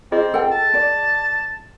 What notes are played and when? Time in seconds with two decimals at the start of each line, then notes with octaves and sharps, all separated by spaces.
0.12 C4 F4 G#4 D#5
0.34 A4 G5
0.52 A5
0.74 D5